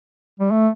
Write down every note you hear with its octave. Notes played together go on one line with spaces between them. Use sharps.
G3
A3